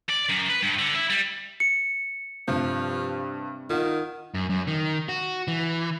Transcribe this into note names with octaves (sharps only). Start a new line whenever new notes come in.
D5
F#2
B4
G2
D3
E4
G3
C#7
G2 C3 F3
D#3 F4 F#5
F#2
F#2
D#3
F#4
E3